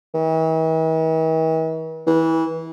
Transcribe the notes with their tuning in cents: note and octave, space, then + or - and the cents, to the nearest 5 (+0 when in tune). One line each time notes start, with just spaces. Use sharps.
E3 -45
E3 -20